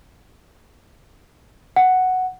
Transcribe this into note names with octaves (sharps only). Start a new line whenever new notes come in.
F#5